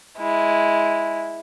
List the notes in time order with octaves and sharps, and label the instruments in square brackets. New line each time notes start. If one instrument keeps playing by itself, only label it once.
[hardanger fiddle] G#3 E4